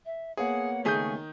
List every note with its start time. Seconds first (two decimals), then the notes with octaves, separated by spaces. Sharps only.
0.05 E5
0.37 A#3 B3 G#4 C#5 F#5
0.85 C#2 D#3 A3 G#4 C#6 D#6 G6